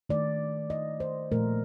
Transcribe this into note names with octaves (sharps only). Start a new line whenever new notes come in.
D#3 A3 D5
D#5
C5
A#2 F3 A3 A#4